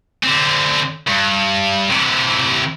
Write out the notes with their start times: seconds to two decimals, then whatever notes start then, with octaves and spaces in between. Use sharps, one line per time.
0.23 D3 C4
1.08 G2
1.90 C3 E3